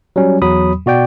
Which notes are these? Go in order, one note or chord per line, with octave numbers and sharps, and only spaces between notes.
F#3 G3 C#4
E2 F#3 B5 D#6
B2 F#4 D5 G5